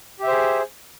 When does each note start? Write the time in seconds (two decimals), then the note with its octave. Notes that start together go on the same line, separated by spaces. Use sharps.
0.19 G4
0.23 E5
0.27 C5
0.31 G#4